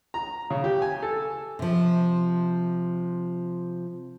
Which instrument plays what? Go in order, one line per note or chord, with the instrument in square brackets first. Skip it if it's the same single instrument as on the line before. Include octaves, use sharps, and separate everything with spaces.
[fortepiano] A#5
C#3
G4
G#5
A4
[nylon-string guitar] C3 F3